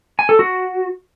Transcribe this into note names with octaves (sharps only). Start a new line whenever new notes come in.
G#5
A4
F#4